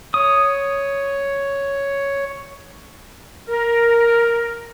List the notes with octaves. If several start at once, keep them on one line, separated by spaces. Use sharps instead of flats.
C#5 D#6
A#4